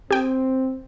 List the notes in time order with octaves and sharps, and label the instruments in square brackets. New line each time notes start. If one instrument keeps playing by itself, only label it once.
[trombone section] C4 [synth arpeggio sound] G4 G5 D#6